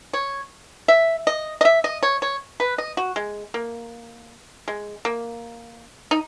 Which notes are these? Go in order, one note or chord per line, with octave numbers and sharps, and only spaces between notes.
C#5
E5
D#5
D#5
E5
D#5
C#5
C#5
B4
D#5
F#4
G#3
A#3
G#3
A#3
D#4